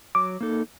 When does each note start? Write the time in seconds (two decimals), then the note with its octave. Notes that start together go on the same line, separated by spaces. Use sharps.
0.15 F#3 D6
0.41 A#3 D#4 A4